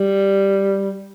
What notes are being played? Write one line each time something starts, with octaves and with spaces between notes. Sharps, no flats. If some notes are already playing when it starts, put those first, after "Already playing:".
Already playing: G3